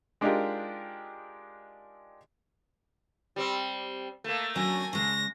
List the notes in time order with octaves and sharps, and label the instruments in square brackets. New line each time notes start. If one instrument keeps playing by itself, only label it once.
[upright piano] G#3 D4 D#4 F4 G4 A#4
[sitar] G3 C4
A3 A#3
[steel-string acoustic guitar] D3 F#3 C#4 [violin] G#5 A#6
[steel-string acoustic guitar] C#3 G#3 [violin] A#6